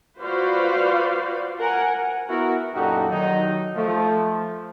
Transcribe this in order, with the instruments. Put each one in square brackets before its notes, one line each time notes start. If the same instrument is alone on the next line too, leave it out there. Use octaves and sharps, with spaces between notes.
[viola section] F4 F#4 B4 C5 D5 F5
A#4 F#5 G#5
[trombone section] B3 E4 F#4 A#4
F#2 A#2 D#4 F#4 G4 A4
D#3 F#3 D#4
F3 A3